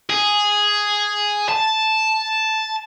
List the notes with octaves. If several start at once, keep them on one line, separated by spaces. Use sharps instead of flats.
G#4
A5